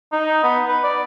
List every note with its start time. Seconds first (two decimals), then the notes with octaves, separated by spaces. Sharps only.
0.12 D#4
0.43 B3
0.67 B4
0.84 D5